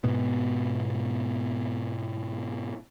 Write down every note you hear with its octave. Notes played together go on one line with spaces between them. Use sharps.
G#2 B2 B3